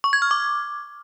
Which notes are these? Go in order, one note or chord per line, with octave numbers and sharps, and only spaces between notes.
C#6
G#6
F6
D6